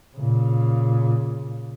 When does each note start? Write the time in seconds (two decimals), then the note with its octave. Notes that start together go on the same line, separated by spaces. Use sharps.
0.17 A#2 C#3